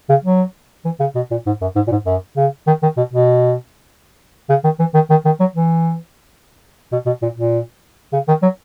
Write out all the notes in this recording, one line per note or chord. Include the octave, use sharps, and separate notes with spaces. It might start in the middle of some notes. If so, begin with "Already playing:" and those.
C#3
F#3
E3
C#3
B2
A#2
G#2
F#2
G#2
A#2
G#2
F#2
C#3
D#3
D#3
B2
B2
C#3
D#3
E3
D#3
D#3
D#3
F#3
E3
B2
B2
A#2
A#2
C#3
D#3
F#3